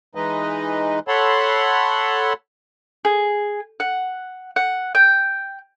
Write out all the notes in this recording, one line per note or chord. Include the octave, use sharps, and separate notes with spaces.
E3 G#3 D#4 B4 D#5
A4 C#5 F#5 A5 B5 C6
G#4
F#5
F#5
G5